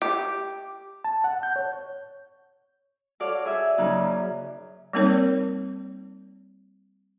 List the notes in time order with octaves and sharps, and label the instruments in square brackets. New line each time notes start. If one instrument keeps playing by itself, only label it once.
[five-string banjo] G4
[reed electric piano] A5
F#5
G6
C#5
[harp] F#4 A4 C#5 D5 F5
G#4 E5
F#2 C#3 A#3 D#4 F#6
[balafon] G3 A#3 C4 D#4 A#4 C#5